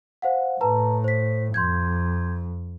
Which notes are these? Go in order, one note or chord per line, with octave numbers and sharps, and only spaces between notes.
C5 F5 F#5
A2 B4 A5 A#5
C5 B6
F2 C6 G6 G#6